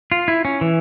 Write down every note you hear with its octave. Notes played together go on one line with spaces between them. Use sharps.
F4
E4
C#4
E3